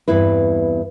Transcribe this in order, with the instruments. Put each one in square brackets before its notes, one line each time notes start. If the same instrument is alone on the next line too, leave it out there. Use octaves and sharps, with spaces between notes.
[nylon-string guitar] E2 G2 C4 E4 B4